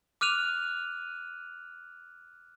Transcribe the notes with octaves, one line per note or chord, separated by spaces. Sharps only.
D6 F6 F#6 D#7 F7